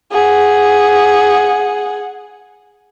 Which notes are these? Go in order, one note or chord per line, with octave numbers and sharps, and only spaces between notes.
G#4 F#5